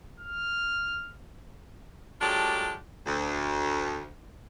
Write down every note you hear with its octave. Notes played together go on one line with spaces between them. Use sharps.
F6
F#3 G#3 D4 F4 G4 A4
D2